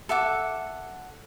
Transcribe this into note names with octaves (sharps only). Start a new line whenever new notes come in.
A4 E5 F#5 D6